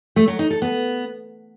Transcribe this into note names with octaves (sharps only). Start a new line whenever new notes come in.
A3
F#3
D#4
A4
B3